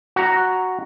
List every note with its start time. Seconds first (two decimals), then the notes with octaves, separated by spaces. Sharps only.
0.16 F#4 A#5